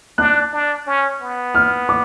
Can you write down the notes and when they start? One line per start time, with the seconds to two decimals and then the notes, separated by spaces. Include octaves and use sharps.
0.18 D4 F#6
0.52 D4
0.87 C#4
1.21 B3
1.55 F6
1.89 D6